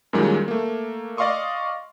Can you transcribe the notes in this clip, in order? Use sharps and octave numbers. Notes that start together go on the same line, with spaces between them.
F#2 A#2 D#3 G3 G#3
A3 A#3
D5 D#5 F5 C6 C#6 D#6